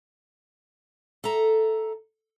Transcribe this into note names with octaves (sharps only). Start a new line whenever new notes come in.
A4 E5 A#5